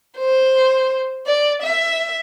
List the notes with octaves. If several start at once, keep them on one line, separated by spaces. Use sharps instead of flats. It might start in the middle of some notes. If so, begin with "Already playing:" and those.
C5
D5
E5